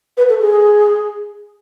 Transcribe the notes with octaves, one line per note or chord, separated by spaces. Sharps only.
B4
A4
G#4